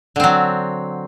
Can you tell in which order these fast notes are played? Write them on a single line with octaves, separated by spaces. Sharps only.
D3 C4 F#3